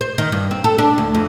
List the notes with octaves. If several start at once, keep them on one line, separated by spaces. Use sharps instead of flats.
C5
D#3
G2
C4
A4
D4
D2
F2